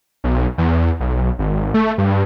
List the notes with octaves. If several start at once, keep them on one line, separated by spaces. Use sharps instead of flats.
B1
E2
B1
G#1
A3
G2